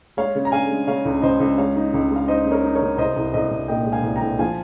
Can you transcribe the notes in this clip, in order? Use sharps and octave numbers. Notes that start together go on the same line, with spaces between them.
G#3 C#5 F5
C#3
A#5
C#3 F5 G#5
G#3
C#3 C#5 F5
C#2
C#2 C5 D#5
C#2
G#3 C#5 F5
D#4
C#2
G#3
F5
D#4 C5 D#5
C#3
A#4 C#5
D#4
A#4 C#5
C#3
C2 C5 D#5
C2
C2 C5 D#5
C2
A#2 D#5 G5
G#3
F5 G#5
C2
G5 A#5
C2
F3 F5 G#5